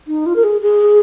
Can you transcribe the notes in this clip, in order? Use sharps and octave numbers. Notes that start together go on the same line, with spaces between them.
D#4
F4
A#4
G#4
G#4